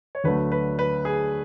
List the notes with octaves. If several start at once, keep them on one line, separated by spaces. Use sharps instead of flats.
C#5
D2 D3 F#3 A3 B4
B4
B4
G#4